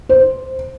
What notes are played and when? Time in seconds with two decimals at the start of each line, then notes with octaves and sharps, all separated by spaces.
0.09 C5